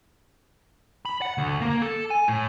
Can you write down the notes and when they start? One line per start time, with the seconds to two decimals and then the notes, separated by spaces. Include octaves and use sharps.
1.05 B5
1.22 F#5
1.38 D2
1.61 A#3
1.82 A4
2.10 G#5
2.28 A2